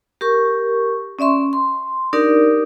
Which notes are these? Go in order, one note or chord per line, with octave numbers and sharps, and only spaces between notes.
G4 A#4 C#6
C#4 D5 E5 C6 C#6
C6
D4 D#4 G4 A#4 D5